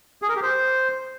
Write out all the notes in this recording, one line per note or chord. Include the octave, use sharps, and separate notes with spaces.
G#4
A#4
G4
C5